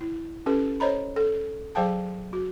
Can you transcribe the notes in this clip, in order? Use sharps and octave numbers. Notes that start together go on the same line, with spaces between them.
E4
C#4 G4 A4 B4
A4 C5 C#5 D#5 A#5 B5
A4
F#3 G#4 C5 F5 G5 A5
F#4